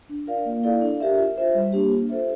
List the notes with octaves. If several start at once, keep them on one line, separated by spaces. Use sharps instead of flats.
D4
F4 A#4 D5 F5
A#3
E4 A4 D5 F5
D4
G4 A#4 E5
F4
C5 E5
G3
A#3 D4 G4
F4
A4 C5 E5